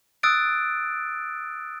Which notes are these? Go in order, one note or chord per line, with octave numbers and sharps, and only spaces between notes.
D#6 E6 F#6 A6 D7